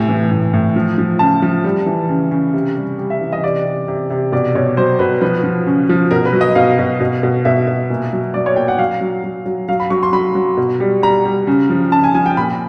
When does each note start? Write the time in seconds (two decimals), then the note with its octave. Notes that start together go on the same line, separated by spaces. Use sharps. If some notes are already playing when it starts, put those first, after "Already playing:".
Already playing: A2 C3 G#5
0.09 E3
0.31 A2
0.53 A2
0.76 F3
0.98 F3
1.19 C#3 A5
1.42 F3
1.64 G3
1.86 E3
2.09 C#3
2.31 C#3
2.53 C3
2.76 G3
2.98 G3
3.10 E5
3.21 E3
3.33 D#5
3.44 C3 D5
3.66 C3
3.88 C3
4.10 C3
4.32 B2 D5
4.55 B2 C#5
4.77 F#3 C5
4.99 B2 B4
5.21 F3 B4
5.44 F3
5.67 C#3
5.89 F3
6.11 B2 A#4
6.26 B4
6.33 F#3
6.41 D#5
6.55 B2 F5
6.79 B2
7.00 B2
7.23 B2
7.45 B2 E5
7.67 B2
7.90 A#2
8.13 F#3
8.34 F#3 D5
8.46 C#5
8.56 A#2 G5
8.68 F#5
8.79 F#3 F5
9.01 F#3
9.24 F#3
9.46 F#3
9.69 F#3 F5
9.80 B5
9.90 F#3 C#6
10.03 C6
10.13 F#3 B5
10.35 F#3
10.57 B2
10.80 G3
11.03 G3 A#5
11.25 G3
11.47 C#3
11.70 F3
11.91 C#3 A5
12.04 G#5
12.15 F3 G#5
12.26 G5
12.37 A#2 B5